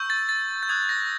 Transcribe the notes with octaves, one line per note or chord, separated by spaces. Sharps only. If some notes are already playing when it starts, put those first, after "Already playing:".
Already playing: C#6 E6 G6
A6
A6
G6
D#6 F#6 G#6
A#6